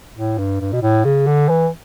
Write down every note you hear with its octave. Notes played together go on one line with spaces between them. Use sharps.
A2
G2
G2
B2
A2
C#3
D3
E3